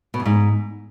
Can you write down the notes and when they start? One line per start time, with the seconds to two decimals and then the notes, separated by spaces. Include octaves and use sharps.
0.14 B2
0.20 F#2
0.26 G#2